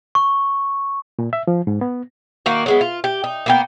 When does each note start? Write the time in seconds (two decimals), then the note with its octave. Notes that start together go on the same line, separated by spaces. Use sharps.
0.15 C#6
1.19 A#2
1.33 E5
1.47 F3
1.67 G#2
1.81 B3
2.46 D#3 A#3 F#4
2.66 F#3 G#3 B3
2.81 F4
3.04 G4
3.24 D#4
3.46 A#3 B3 G5